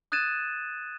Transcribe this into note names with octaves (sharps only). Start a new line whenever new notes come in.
D#6 F#6 G#6 A6 D#7 E7